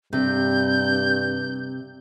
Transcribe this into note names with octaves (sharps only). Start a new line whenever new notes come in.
G2 C3 G6